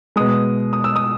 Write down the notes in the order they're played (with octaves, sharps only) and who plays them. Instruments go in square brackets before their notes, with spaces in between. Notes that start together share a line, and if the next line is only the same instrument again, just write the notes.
[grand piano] B2 G#3 D#6
D#6
E6
D#6